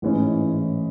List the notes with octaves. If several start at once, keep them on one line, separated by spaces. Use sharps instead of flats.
A1 G#2 E3 G#3 C#4